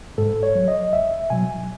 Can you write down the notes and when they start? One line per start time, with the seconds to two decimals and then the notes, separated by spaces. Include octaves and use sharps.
0.18 G#2 A4
0.43 C#5
0.55 F#3
0.68 D#5
0.93 C#2 E5
1.30 B2 F#3 G#5